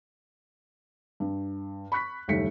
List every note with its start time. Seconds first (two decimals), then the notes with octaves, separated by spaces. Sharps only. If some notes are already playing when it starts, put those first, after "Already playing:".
1.20 G2
1.92 B5 C#6 F#6 B6
2.28 F#1 D#2 G3 A3 B6 C#7